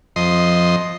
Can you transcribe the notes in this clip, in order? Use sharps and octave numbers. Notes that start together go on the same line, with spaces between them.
F2 D#5 C6